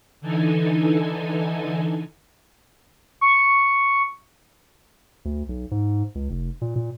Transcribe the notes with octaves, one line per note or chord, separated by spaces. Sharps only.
D3 E3 D#4 A4 G#5
C#6
D2
B1
G#2
C#2
F1
A#2
A#2